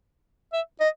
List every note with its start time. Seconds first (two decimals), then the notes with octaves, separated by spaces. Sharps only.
0.53 E5
0.80 D#5